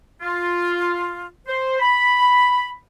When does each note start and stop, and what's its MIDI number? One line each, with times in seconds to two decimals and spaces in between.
0.22 1.28 65
1.47 1.77 72
1.80 2.72 83